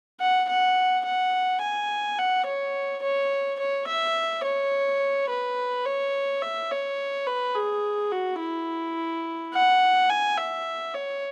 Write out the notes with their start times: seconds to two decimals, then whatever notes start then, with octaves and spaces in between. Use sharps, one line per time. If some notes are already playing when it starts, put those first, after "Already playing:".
0.21 F#5
0.49 F#5
1.05 F#5
1.62 G#5
2.19 F#5
2.47 C#5
3.03 C#5
3.59 C#5
3.88 E5
4.44 C#5
5.30 B4
5.86 C#5
6.42 E5
6.71 C#5
7.27 B4
7.56 G#4
8.12 F#4
8.40 E4
9.54 F#5
10.10 G#5
10.38 E5
10.94 C#5